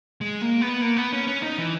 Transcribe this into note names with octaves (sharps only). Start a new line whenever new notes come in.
G#3
A#3
B3
A#3
B3
C#4
C#4
D#4
E3